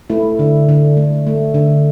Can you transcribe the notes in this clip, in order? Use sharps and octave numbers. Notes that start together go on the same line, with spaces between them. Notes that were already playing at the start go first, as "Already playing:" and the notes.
A3 E4
D3
D3
A3
A3
D3